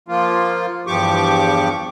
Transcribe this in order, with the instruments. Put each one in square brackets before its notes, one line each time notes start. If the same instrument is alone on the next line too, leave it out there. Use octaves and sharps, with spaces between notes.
[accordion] F3 A#3 F4
E2 G2 F3 G4 C#6 D6